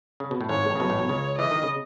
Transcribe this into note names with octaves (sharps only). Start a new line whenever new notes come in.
C#3
B2
A2
G#1 G#2 C#5
A1 A2
C#3
B1 B2 C#5
A1 A2
B1 B2
C#2 C#3
E3 D#5
D#3
C#3